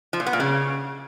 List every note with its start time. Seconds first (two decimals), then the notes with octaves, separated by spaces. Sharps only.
0.13 F3
0.20 A#2
0.26 B3
0.33 A#2
0.40 C#3